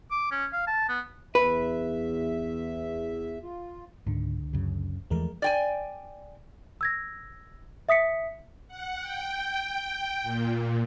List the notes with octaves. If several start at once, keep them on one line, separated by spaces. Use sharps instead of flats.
D6
C#4
F5
A5
B3
E2 B4 E5
F4
C#2 G#2 D3
F#2 C#3
E2 E3 F3 G#3 A3 A#4
D5 G5 G#5
E6 G#6 A#6
E5 D#6 B6 C#7
F#5
G5
A#2